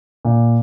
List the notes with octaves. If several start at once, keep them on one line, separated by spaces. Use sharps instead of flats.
A#2